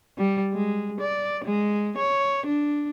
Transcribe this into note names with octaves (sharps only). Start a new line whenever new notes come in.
G3
G#3
D5
G#3
C#5
D4